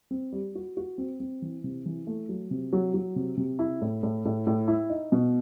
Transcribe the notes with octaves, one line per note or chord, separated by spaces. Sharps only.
C4
G3
F#4
F#4
C4
C4
E3
C3
E3
A3
F#3
C3
F#3
F#3
C3
C3
E4
A2
A2
A2
A2
E4
D#4
B2